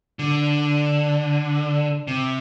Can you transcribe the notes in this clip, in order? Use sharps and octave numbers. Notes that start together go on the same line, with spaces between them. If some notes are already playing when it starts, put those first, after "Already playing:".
D3
C3